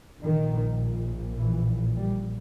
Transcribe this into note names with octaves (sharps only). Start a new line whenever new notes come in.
A#1 A#2 D#3
E3
G3